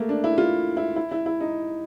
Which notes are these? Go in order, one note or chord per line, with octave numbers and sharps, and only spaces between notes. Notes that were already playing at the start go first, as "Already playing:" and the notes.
Already playing: A3 A#3
D4
E4
F4
E4
E4
E4
E4
D#4